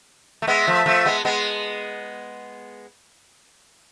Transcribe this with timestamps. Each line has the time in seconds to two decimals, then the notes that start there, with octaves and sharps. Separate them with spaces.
0.42 A3
0.47 G#3 B3 E5
0.67 F3 A3
0.86 F3 A3
1.05 G#3 B3
1.25 G#3 B3